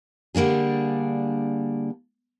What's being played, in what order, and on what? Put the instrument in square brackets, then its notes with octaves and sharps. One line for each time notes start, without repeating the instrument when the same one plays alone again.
[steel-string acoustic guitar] D3 G3 A#3 D4 G#4